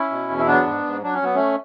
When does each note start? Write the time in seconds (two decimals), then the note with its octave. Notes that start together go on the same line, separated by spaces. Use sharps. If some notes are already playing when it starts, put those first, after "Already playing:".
Already playing: C#4 E4
0.10 B2
0.29 E2
0.38 E4
0.47 F#3 B3 D4
0.66 G#2
0.85 G#2
1.03 F#3 D4
1.14 C#4
1.22 F#3 B3
1.35 A3 C#4